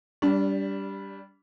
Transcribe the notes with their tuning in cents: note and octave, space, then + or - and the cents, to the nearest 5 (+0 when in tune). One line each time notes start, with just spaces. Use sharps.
G3 +0 D4 -25